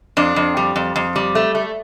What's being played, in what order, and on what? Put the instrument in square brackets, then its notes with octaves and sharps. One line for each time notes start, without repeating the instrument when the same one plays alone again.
[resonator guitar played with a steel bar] F2 D4
F2
G3
F2
F2
G3
A3
A3